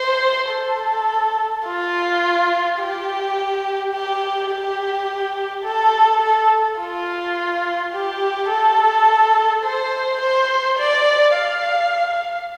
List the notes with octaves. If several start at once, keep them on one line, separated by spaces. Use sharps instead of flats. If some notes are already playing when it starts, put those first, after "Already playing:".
Already playing: C5
A4
F4
G4
G4
G4
A4
A4
F4
G4
A4
C5
C5
D5
F5